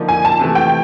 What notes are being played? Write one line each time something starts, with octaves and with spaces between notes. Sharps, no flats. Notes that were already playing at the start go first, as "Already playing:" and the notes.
Already playing: D3 F3 A#3 D#4
G#5
A5
C3 E3 A3
G5